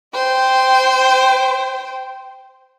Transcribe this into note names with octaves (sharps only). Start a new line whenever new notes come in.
C5 G5